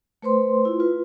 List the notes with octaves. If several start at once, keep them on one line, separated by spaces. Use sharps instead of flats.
A3 B4 C5 C6
E4 F4
F4 B4